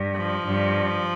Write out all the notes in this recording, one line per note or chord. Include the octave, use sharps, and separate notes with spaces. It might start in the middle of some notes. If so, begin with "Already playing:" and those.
Already playing: G2
F3
G2